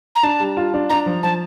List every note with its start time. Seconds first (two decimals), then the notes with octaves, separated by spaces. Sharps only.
0.15 A#5
0.23 D4 A5
0.40 G3
0.57 F4
0.74 D4
0.89 D4 A#5
1.06 F3
1.23 F3 A5